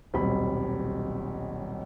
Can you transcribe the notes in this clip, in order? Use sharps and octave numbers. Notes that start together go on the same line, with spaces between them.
D#1 B1 G3 C4 D#5 B5